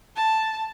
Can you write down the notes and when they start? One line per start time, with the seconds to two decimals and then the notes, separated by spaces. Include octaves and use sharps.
0.16 A5